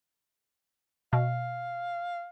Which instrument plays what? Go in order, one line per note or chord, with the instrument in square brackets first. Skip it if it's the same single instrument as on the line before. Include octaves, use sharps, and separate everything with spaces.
[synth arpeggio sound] B2 [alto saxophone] F5